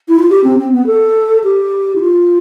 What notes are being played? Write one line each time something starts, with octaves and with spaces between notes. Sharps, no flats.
E4
F4
G4
C4
C4
B3
A4
G4
E4
F4